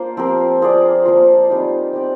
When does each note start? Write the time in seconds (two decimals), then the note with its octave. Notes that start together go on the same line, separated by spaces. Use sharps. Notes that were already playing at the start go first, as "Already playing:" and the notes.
Already playing: A#3 D4 F4 C5
0.17 F3 C4 G4 A#4
0.61 C4 F4 G#4 D5
1.05 F3 A#3 F4
1.50 G3 C4 D#4
1.93 C4 G4 D5